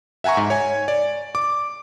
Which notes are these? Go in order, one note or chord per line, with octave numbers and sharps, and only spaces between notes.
E5 F#5 G#5 A#5 C#6
G#2
C#5 G#5
D5
D6